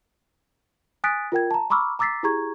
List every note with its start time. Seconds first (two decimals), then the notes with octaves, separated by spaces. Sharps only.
1.04 G#5 D#6 F#6 A6 B6 D7
1.32 F4 A#4 G5 G#6
1.51 A5 A#5
1.70 A#5 B5 C#6 D6 E6 F6
1.99 A#5 D6 E6 A6 B6 C7
2.23 E4 G4 G#4 A#5 C#6 G#6